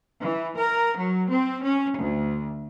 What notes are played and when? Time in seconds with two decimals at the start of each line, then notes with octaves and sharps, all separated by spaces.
0.23 E3
0.58 A#4
0.98 F#3
1.32 C4
1.64 C#4
1.99 D2